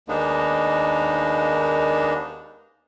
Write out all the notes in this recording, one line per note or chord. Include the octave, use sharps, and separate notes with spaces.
D#2 G#3 A#3 B3 D4 D#4